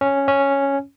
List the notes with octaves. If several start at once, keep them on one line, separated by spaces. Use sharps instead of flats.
C#4
C#4